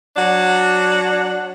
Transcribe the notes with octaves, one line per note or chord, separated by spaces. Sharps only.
F#3 D4 F#5